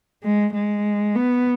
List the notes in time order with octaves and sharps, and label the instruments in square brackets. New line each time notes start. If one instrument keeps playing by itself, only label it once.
[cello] G#3
G#3
B3